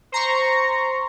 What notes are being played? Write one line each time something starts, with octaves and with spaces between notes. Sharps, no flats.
C5 A#5 C6 C#6